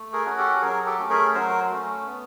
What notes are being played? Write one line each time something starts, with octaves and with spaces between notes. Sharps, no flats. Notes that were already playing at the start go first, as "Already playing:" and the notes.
Already playing: A3
G#4 A#4
C#4 F#4
G4 A4
F#3 G#4 A#4
G4 A4
A3 C#4
G#4 A#4
F#3 A#4 C5
A3 C#4
B3